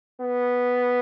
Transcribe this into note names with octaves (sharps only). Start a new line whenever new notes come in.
B3